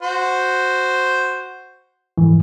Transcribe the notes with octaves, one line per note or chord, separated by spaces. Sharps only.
F#4 C5
F2 G#2 E3